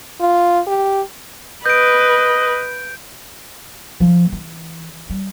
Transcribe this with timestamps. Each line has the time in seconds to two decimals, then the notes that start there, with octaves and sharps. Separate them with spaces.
0.20 F4
0.67 G4
1.66 B4 D#5 G6 D7
4.00 F3
4.32 E3
5.10 G3